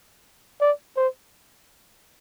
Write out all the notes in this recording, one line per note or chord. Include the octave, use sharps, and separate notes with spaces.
D5
C5